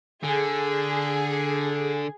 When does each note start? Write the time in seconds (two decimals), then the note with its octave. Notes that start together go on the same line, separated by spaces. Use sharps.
0.23 D3 G#4